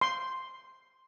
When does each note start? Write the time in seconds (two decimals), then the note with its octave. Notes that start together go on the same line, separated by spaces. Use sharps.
0.01 C6